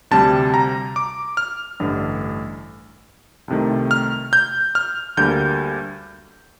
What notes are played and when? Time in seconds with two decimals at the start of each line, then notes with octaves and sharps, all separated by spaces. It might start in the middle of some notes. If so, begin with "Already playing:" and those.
0.11 D2 C3 G3 A5
0.54 A#5
0.96 D6
1.37 F6
1.80 A1 G2 D3 A3
3.48 C2 C3 D#3 A3
3.91 F6
4.33 G6
4.75 F6
5.17 D2 D3 G3 A#3 G6